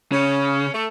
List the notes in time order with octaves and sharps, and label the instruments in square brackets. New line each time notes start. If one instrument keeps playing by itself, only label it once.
[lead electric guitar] C#3 [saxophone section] C#4
[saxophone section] A3